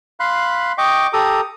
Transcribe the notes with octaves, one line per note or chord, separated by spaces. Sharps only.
F5 B5 C6 F#6
D#5 G5 C#6 D6
G4 A4 A#5 D#6